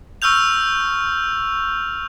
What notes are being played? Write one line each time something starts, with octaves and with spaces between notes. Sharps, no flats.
C#6 E6 F6 G6 F7